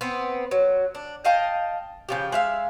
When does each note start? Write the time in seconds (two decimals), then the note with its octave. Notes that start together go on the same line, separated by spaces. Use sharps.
0.01 B3 C4
0.51 F#3
0.95 D4
1.25 D#5 F5 G5 A5
2.09 C#3 F3 G4
2.32 G#3 E5 F5